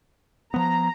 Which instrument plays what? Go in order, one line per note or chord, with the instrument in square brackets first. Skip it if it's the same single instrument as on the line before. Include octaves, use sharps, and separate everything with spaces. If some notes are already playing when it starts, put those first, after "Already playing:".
[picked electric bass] F3 B3 [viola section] A#5